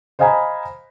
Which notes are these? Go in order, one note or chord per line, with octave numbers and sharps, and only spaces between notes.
C5 D#5 F5 G#5 A#5 B5